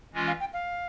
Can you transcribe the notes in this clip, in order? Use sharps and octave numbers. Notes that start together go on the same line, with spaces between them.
E3 G#3 C#4 F4
F5
G5
F5